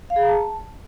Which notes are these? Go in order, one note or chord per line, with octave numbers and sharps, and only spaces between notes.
F5
G#4
A#5
A5